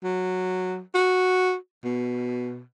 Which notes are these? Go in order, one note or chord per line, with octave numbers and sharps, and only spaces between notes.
F#3
F#4
B2